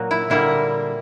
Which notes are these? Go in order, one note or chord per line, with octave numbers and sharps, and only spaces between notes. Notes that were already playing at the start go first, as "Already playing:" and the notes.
Already playing: A#2 F#3 A#3 F#4
E4
D3 G3 A#3 E4